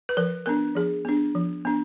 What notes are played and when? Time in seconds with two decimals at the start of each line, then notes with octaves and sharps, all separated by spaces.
0.09 B4
0.17 F3 A#4
0.46 B3 D4 A#4
0.75 F3 G#4
1.05 B3 D4
1.35 F3
1.65 B3 D4